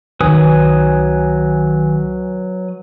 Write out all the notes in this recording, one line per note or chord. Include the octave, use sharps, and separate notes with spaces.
C2 D#3 F#3 B4 G#5 D#6